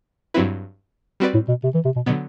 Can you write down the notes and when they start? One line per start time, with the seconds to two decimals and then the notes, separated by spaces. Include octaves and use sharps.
0.34 G2 F#3 C4 E4 B4
1.20 G3 C4 F#4 B4 D5
1.34 A2
1.48 B2
1.64 C3
1.75 E3
1.85 C3
1.96 B2
2.06 B2 D3 F#3 B3